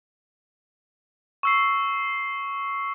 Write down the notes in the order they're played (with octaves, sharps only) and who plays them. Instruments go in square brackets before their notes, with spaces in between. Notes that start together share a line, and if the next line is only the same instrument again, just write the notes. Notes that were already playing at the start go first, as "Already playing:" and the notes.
[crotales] C#6 E6 C7